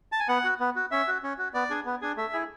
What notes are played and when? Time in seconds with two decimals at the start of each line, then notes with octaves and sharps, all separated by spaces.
0.12 A5
0.20 G#5
0.28 B3 F#5
0.44 F#4
0.60 B3
0.76 F#4
0.91 C#4 E5
1.08 F#4
1.23 C#4
1.38 F#4
1.54 B3 D5
1.70 D4 G#4
1.85 B3
2.02 D4 G#4
2.17 A3 E5
2.33 E4 G#4